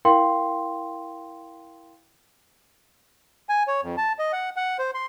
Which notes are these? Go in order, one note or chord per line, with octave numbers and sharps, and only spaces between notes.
E4 A#4 F5 G5 C6
G#5
C#5
F2
A5
D#5
F#5
F#5
C5
C6